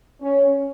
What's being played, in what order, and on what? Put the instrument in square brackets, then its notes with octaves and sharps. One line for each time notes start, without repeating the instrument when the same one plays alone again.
[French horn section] C#4